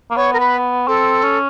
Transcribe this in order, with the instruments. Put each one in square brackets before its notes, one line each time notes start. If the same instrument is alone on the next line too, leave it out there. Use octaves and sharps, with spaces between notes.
[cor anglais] A#3
[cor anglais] B3 [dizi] C#5
[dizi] A#4
B4
[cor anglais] C4 [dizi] A4
[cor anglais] C#4